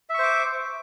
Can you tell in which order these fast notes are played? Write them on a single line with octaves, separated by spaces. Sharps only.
E5 C#6 C5 D6